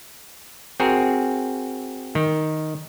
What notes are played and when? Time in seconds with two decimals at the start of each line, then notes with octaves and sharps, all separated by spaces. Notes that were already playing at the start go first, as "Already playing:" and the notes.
0.80 C4 F#4 G#4 A#4
2.15 D#3